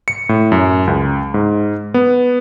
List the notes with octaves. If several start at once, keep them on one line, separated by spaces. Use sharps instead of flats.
C#7
A2
F#2
C#2
G#2
B3